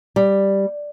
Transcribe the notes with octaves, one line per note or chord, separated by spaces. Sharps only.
G3